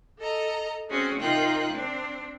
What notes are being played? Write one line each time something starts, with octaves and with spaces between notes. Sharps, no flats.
A4 D#5 A#5
C4 C#4 F#4 G#4
C3 D#4 F4 A#4 G5 F#6
C4 D4